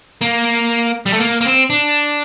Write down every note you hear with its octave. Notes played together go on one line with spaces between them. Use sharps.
A#3
G3
A3
A#3
A#3
C4
D4